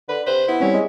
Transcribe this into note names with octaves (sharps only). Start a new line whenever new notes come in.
D3 B4
C3 B4 C5
B3 E4
G3 C4 C#4
G#3